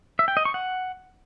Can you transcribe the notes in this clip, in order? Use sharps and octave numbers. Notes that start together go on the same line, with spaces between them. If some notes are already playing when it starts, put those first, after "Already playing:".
E5
G5
D#5
C#6
F#5